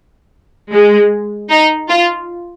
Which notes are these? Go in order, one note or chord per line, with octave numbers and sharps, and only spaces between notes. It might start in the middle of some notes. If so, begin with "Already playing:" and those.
G#3
D#4
F4